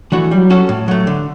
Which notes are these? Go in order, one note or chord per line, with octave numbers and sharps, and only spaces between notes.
E3 A3 D4 F#4
F#3 G3
C#4 F#4 A4
A2
F#3 A3
D3